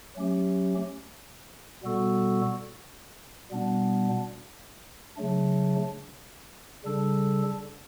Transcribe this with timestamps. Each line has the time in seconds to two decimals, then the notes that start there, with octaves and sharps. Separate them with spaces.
0.16 F#3 A3 C#4 G4
1.83 B2 G3 B3 F#4 A4
3.51 B2 G3 B3 D4
5.17 C#3 F#3 A3 D4
6.84 C#3 G3 D4 A4